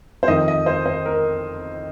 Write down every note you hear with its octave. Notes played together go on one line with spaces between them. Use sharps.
C5
F2 D#3 D#5
D#5
C5
C5
A#4